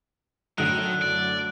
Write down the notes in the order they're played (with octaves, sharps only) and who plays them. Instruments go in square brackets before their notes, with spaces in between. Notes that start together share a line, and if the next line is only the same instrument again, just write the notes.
[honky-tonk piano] F#2 A2 D3 [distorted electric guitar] D#3 [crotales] F#6
[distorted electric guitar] D5